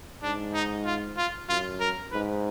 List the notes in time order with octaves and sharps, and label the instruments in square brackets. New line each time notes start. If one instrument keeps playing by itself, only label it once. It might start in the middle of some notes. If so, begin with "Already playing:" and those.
[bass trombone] G#2 [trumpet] D4
[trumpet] D#4
F4
F4
[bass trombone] F#2 [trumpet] F4
[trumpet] A#4
[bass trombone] G#2 [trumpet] B4